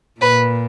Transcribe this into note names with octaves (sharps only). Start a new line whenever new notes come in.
A#2 B4